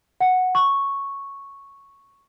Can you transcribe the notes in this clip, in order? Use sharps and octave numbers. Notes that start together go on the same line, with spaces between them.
F#5
C#6